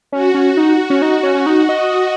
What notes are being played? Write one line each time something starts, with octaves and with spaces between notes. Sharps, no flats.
C#4 F#4
C#4
D#4
C#4
D#4
C#4
C#4
D#4
D#5